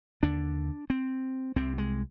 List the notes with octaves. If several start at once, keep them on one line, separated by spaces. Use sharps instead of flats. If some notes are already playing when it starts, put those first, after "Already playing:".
D#2 D3 D4
C4
C2 C3 C4
G#3